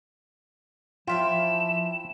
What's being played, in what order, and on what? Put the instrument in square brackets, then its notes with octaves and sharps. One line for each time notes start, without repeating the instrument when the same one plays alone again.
[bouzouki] E3 E5 G5 [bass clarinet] F3 [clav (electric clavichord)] F4 [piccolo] E7